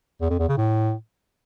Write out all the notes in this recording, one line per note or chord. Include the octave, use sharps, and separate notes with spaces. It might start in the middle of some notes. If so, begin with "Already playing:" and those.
E2
F2
E2
C#3
A2